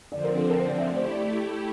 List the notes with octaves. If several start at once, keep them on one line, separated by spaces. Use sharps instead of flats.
D3 F3 C4 D5
A#4
A4
A#4
C5
D5
E5
A3 E4 G4 D5
C5
D5